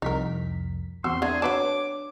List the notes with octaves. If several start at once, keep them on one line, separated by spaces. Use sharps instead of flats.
C2 F2 D#4 A#4 B6
E2 C4 F#4 C6 E6
D3 A3 D4 G#4
F#3 B4 C#5 A5 D6